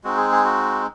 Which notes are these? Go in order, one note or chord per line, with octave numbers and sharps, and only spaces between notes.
G#3 C4 D#4 F#4
G#4
G#4
F#4